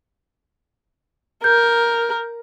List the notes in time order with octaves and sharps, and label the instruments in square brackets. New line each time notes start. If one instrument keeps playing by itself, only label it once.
[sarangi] A#4 [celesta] G6